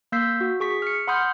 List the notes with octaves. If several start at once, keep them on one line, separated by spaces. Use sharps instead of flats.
A#3 E6 G6 B6 C7
F#4
G#4 C#6 B6
F6 C#7
F#5 B5 C6 D#6 F6 G6